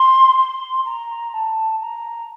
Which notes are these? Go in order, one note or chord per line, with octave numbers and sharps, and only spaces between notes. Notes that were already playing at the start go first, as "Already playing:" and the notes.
Already playing: C6
C6
A#5
A5
A#5